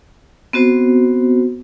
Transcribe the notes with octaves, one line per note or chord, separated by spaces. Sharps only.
B3 C4 F#4 C5